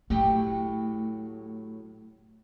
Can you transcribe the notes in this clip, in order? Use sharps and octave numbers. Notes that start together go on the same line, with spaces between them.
A2 F#3 A3 G4